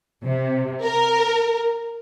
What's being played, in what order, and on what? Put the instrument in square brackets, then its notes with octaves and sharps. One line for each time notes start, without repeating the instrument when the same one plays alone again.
[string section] C3
A#4